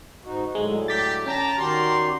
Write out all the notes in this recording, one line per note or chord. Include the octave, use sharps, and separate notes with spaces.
G#2 D#4 F#4
A2 D3 F#3 G#3
G4 A6 B6
C#4 G5 A5 A#5
D#3 F#4 G4 A#4 D5 C6